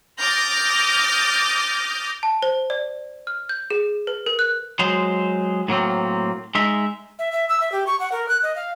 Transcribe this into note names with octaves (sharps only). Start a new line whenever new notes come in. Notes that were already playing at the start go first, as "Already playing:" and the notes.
D6 D#6 F6 G6 A6 A#6
A5
C5
D5
F6
G6
G#4
B4
A#4
F#6
F#3 G#3 C5
A2 F#3 A#3 C4
G#3 D#4 E5
E5
E5
E6
E5
G4
C#6
F#5
A#4
F#6
D#5
F5